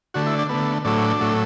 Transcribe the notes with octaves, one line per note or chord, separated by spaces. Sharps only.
D3 A3 F#4
E4
D4
D3 A3 B3
A2 F#3 A3 D4
A2 F#3 A3